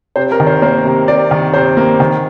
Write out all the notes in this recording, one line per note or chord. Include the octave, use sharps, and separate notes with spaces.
C3 C5
A#4
D#3
C5
A#3 C5
C3
C3 D5
D#3
C3 C5
A#3
D#3